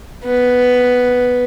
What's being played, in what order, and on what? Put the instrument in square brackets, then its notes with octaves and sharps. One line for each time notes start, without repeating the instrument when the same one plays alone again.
[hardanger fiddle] B3